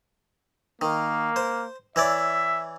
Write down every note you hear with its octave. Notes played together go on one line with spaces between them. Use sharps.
D#3 A#3
C5
E3 C#5 D5 E5